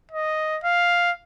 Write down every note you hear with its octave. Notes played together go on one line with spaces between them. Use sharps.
D#5
F5